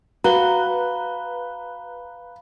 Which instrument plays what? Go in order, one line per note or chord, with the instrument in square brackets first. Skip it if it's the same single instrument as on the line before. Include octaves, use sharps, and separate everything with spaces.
[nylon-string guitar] F#4 [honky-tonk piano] B4 [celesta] F5 B5 G7 [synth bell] A#5